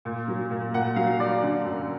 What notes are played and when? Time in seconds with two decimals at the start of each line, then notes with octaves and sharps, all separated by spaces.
0.05 A#2
0.28 F#3
0.51 A#2
0.74 A#2 F#5
0.96 F#3 F5
1.19 F#3 D5
1.43 D3
1.65 F#2